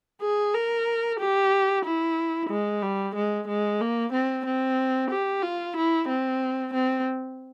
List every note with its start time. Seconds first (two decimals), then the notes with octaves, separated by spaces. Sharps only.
0.21 G#4
0.53 A#4
1.19 G4
1.84 E4
2.50 G#3
2.82 G3
3.15 G#3
3.48 G#3
3.80 A#3
4.13 C4
4.45 C4
5.10 G4
5.43 F4
5.76 E4
6.08 C4
6.73 C4